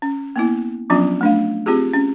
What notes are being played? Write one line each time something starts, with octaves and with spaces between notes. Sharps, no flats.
C#4
A#3 B3 E4
F3 F#3 B3 C#4 D4 F4
A3 D4 F5
C4 F4 G4 G#4
C#4